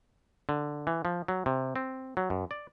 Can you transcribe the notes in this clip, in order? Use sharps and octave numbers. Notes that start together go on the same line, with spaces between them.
D3
E3
F3
F#3
C3
C4
F#3
F#2
D5